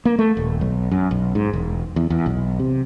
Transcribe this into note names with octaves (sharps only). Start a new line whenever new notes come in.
A#3
A3
D#1
B1
F#2
B1
G#2
E1
E2
E2
B1
C3